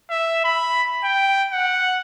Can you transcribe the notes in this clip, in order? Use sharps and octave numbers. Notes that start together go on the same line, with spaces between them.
E5
B5
G5
F#5